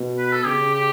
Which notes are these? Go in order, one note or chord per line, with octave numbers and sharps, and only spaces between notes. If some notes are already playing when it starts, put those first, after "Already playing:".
Already playing: B2
B4
A4
C#3 G4
G4